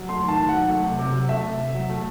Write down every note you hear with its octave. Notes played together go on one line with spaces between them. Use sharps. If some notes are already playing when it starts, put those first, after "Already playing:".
Already playing: F#3
A3 C6
D#3 A5
D#3
F#5
F#3
A3
C3
C3
F#3
A3 E5
C3
C3
F#3
A3